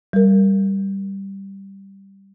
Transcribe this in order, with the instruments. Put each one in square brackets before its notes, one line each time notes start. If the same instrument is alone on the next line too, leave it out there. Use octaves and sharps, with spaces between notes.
[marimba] G3 A#4